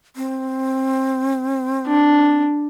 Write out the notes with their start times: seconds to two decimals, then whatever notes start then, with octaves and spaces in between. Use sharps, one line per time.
0.16 C4
1.87 D4